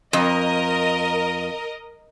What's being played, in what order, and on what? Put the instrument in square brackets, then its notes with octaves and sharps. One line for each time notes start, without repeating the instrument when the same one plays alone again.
[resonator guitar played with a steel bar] F2 [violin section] A#4 D#5